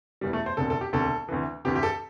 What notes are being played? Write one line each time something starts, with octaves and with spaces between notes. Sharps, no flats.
E1 E2 E3 G3
A3
C5
E1 D2 C3 A4
A4
G4
E1 D2 C3 A4
D2 C3 E3
D2 C3 E3 G4
G4
A4